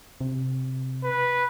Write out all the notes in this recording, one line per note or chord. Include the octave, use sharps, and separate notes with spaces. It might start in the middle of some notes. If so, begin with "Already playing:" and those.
C3
B4